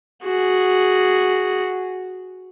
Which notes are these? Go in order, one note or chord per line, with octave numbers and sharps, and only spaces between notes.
F#4 G#4